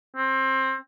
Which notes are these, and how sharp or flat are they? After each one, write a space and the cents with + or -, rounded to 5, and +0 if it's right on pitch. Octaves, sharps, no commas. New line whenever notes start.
C4 +20